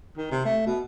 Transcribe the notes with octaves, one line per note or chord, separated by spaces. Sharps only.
D#3
C3
A3
B2